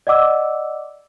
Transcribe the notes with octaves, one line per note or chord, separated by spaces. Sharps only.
D5 D#5 F#5 D6 E6